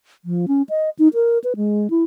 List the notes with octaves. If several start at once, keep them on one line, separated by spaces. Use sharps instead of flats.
F3
C#4
D#5
D#4
A#4
B4
G#3
E4